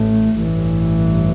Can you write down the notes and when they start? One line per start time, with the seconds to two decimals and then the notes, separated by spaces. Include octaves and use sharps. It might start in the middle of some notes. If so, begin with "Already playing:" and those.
Already playing: A1 A2 A3
0.38 A1 G2 E3